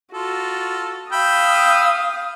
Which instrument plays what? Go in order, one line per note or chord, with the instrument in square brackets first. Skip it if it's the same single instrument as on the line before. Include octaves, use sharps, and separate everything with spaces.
[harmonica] F4 A4 [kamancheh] F#4
[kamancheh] F5 D#6 [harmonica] G5 B5 E6